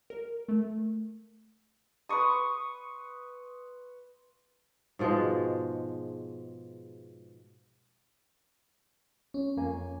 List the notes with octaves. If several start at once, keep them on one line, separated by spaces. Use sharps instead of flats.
A#4
A3
B4 C6 C#6 D#6
G#2 B2 F3 G#3
C#4
F2 A#3 G#5